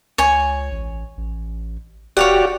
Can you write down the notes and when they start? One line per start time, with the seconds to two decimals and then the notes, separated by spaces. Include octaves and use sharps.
0.18 C#2 C#5 G#5
0.71 A1
1.17 A1
2.17 D#1 F#4 G4 C#5 D5 F5 F#5